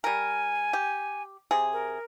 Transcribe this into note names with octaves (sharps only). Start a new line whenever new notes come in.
G3 A#4 G#5
G4
C3 G#4
A#4